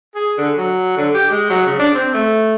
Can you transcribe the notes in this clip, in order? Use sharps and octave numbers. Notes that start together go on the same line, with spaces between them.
G#4
D3
F#3
D3
G4
G#3
F#3
C#3
D4
C4
A3